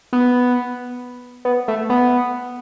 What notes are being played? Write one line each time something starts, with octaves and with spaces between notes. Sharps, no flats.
B3
B3
A3
B3